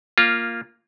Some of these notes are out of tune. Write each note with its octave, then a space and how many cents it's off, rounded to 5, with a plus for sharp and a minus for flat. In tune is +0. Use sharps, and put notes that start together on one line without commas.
A#3 +0 F4 -5